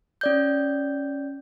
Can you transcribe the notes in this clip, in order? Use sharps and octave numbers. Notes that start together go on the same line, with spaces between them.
C#4 D5 G6